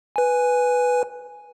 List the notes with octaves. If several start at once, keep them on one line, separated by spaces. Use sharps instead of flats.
B4 G#5